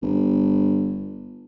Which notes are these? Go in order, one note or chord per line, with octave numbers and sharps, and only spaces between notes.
G1